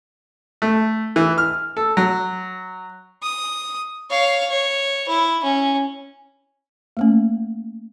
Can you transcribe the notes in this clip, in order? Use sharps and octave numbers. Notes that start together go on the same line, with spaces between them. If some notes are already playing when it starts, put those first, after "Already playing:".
A3
E3
F6
A4
F#3
D#6
C#5 F5
C#5
E4
C#4
A3 A#3 C#4